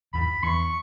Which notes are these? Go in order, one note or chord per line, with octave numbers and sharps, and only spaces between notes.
E2 G#2 B5
E2 C#6